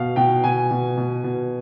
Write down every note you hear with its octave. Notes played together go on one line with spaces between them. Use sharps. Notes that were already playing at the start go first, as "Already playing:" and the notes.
Already playing: B2 F5
B2 G5
B2 G#5
B2
B2
B2